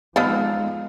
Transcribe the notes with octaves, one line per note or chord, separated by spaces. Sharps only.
F3 G#3 B3 D#4 A4 F5